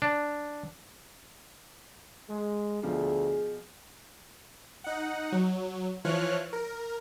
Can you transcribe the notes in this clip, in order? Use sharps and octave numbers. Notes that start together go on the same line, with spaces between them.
D4
G#3
D2 B2 F3 G#4
D#4 F#5
F#3
E3 F3 C#5 F6 F#6
A#4